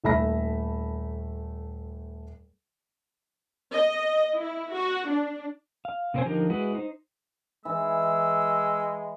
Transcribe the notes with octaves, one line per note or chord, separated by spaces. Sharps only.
D#1 A3 E5 B5 A#6
D#5
E4
F#4
D4
F5
C3 A#3 C4 C#4 C5 G#5
D3 F3 D#4 G4 A#4
G#3 E4 F#4 G#4 B4
D#4 C5
E3 G#3 E6